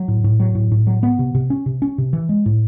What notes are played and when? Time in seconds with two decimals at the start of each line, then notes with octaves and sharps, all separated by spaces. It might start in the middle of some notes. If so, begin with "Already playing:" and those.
Already playing: F#3
0.08 A2
0.24 A2
0.40 F#3
0.55 A2
0.72 A2
0.87 F#3
1.03 B3
1.19 C3
1.35 C3
1.50 C#4
1.66 C3
1.82 C#4
1.98 C3
2.13 E3
2.29 G#3
2.46 A2